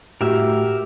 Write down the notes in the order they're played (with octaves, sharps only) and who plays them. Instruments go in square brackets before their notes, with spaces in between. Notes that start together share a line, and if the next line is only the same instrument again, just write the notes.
[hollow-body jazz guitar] A2 F#4 [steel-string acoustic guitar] G4 [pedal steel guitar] A#4 E5